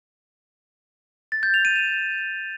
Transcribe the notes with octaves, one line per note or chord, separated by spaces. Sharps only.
A6
G6
F7
D#7
E7